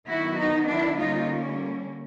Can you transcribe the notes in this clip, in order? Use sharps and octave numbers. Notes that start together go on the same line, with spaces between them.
D#3 F#3 B3 E4 F#4
D#4
D4 E4
D3 G3 A#3 C#4 D#4 F4